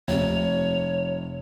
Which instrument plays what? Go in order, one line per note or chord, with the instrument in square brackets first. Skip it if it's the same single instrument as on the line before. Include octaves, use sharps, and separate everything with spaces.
[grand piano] F1 C3 [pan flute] C#5